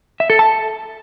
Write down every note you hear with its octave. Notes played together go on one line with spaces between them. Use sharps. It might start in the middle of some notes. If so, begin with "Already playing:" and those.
E5
A4
A5